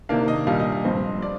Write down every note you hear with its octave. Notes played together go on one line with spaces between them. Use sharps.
C3 D#3 A#3 D4 F5
D#5
A#2 G3 D4 F5
D#5
F5
G2 F3 C4 D#5
D5